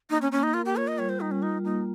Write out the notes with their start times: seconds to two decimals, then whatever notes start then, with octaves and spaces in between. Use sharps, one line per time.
0.10 A#3 D#4
0.22 C#4
0.32 A#3 C#4
0.43 D#4
0.54 F4 A#4
0.65 G4
0.76 F4 C#5
0.87 D#5
0.98 G3 C#5
1.09 C5
1.20 G3 D#4
1.31 C#4
1.42 D#4 F4
1.64 A#3 D#4